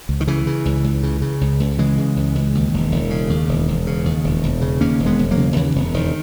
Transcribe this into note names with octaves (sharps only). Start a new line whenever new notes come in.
C#2
D#3
C#3 E3
C#3
C#2
C#2
C#3
C#3
C#2
C#2
C#3 E3 G#3
C#3
C#2
C#2
D#2
E1
E1
C#3
D#2
E1
E1
C#3
D#2
E1
E1
C#3
D#2 A#3 C#4
E1
G#3 B3
E1
F#3 A#3
C#3
D#2 E3
E1
E1 D#3